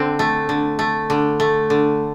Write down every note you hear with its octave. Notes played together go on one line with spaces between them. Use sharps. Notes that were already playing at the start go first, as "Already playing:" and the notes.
Already playing: D3 C4
A3
D3
A3
D3
A3
D3